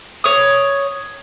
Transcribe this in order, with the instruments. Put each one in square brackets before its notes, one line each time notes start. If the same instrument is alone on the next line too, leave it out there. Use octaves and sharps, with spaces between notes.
[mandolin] C#5 D#6